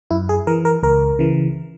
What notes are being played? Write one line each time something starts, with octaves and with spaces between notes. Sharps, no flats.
F#2 E4
G#4
E3 A#4
A#4
C#2 A#4
C#3 E3